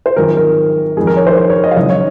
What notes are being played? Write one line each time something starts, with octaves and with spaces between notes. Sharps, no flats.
C5
G#1 F#2 F3 G#3 A#4
A#4
F2 D#3 G#3 G#4
A#4
C#5
C5
C5
C#5
D#5
F5
F#1 F#2 D#3 G#3 D#5
C#5